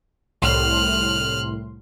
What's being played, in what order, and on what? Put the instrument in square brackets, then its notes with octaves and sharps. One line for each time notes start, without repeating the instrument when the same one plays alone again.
[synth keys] C2 A2 C6 [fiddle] F6 F#6